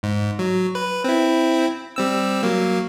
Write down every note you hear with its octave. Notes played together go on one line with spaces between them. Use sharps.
G#2
F#3
B4
C4 E4
G3 C4 E6
F#3 A#3